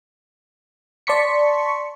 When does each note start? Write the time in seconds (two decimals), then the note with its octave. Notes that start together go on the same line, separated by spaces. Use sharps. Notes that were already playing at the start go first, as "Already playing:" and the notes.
1.07 D5 A5 C6 C#6 B6 C#7